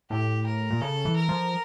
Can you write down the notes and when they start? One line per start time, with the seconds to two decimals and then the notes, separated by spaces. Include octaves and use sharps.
0.10 A2 G4
0.46 A#4
0.70 A#2
0.81 C#3 A4
1.05 E3
1.16 A#4
1.29 F3